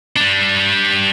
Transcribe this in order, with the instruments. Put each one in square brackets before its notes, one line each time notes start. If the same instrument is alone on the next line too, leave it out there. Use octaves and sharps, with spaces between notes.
[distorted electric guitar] G3 D4